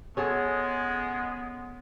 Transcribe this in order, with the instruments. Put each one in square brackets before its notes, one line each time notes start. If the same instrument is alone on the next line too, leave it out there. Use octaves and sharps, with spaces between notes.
[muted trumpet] G#3 [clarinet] B3 [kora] C#4 G#4 A4